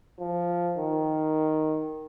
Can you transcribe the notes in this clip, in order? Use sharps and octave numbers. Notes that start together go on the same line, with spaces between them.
F3
D#3